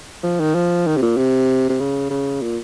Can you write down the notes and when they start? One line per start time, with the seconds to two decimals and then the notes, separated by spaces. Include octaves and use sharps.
0.23 F3
0.40 D#3
0.55 F3
0.87 D#3
0.97 C3
1.02 A#2
1.17 C3
1.69 C3
1.80 C#3
2.10 C#3
2.42 A#2